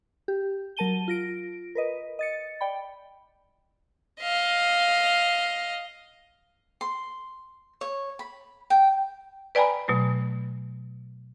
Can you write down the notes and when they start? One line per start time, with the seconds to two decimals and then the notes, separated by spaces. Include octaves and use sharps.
0.28 G4
0.77 F#3 A#4 A5 D#7 G7
1.08 F4 A#6 D7
1.75 A#4 B4 D#5
2.19 D#5 A6 C#7
2.61 D5 G5 B5
4.21 D#5 F5
6.81 C6
7.81 C#5
8.19 B5
8.70 G5
9.55 B4 D5 G5 G#5 A#5 B5
9.88 B2 F#3 A3